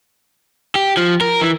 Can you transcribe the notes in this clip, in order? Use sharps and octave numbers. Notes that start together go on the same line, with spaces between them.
G4
F3
A#4
E3